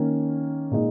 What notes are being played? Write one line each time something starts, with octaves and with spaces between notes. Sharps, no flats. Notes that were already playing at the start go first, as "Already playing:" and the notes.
Already playing: D#3 A#3 C#4
A#2 G#3 D#4